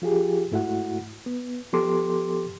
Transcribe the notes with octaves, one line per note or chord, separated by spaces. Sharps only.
F3 F4 G4 G#4
G#2 A3 E4 F#4 F#5
B3
F3 B3 G4 A4 C6 D6